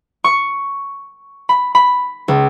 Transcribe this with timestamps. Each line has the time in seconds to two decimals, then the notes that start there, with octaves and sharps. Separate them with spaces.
0.24 C#6
1.49 B5
1.75 B5
2.28 C#2